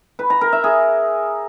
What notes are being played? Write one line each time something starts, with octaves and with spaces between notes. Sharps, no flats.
B4
A#5
A#4
E5
G#4